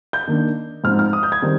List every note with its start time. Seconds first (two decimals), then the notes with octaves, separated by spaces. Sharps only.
0.13 G6
0.28 D#3 A#3 D4
0.84 G#2 F3 C4 D#4 F6
0.99 F6
1.13 D#6
1.23 G6
1.32 G#6
1.42 D#3 G3 C4